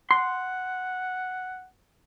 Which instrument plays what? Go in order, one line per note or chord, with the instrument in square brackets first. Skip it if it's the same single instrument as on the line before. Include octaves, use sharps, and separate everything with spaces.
[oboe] F#5 [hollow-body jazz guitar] C6